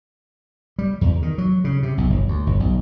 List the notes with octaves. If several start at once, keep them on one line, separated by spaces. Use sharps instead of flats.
G3
E2
D#3
F#3
C#3
C3
B1
G1
D2
G1
B1